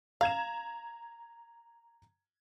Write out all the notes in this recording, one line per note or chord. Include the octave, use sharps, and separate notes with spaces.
F5 A#5 G#6 E7